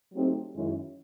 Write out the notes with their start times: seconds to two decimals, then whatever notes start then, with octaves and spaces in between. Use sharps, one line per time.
0.13 F#3 A3 C4 D#4 G4
0.54 F#2 D#3 G#3 C#4 E4